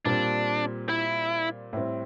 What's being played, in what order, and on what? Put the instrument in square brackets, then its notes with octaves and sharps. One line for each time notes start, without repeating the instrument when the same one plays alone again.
[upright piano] A#2 G3 C4 [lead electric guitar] D4
[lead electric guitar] E4
[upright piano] A2 G3 C4